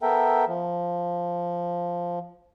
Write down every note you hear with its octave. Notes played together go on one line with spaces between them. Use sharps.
B3 A4 A#4 E5 G5
F3